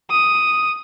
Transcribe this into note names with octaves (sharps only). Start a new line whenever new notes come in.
D#6